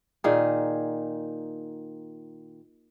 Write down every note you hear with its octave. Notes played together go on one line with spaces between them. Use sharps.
A#2 D#3 G#4